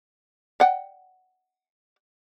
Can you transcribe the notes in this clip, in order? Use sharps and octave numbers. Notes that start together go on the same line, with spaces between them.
D5 F#5 G5